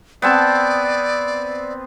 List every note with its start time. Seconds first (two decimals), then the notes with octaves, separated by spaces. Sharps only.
0.22 B3 C4 D5 A5